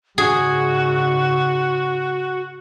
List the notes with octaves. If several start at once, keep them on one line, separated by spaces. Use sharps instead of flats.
G#2 C#3 F#4 G#4